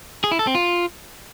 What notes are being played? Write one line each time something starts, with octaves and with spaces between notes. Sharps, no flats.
G#4
E4
A4
C4
F4